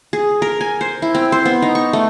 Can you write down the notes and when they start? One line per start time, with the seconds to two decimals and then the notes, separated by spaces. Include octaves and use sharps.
0.13 G#4
0.42 A#4
0.61 G#5
0.81 C5
1.02 E4
1.15 C4
1.32 C5
1.45 B3
1.62 D#4
1.75 C#6
1.93 A3